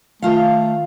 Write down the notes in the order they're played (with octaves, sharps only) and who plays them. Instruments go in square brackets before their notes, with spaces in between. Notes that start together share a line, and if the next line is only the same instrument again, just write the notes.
[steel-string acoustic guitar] D#3 F4 F5 [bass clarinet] A3